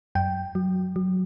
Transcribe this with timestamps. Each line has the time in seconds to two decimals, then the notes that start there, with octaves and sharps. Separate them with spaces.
0.15 F#2 G5
0.55 F#3
0.96 F#3